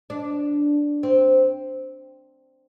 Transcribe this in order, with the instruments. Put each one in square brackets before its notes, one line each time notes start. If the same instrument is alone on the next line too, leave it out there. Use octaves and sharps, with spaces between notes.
[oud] D4
C4